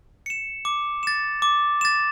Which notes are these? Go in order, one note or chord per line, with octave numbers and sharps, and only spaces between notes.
C#7 E7
D6
A6 E7
D6
A6 E7